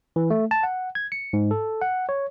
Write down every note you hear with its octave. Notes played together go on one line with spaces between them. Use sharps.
E3
A3
A5
F#5
G#6
C#7
G#2
A4
F#5
C#5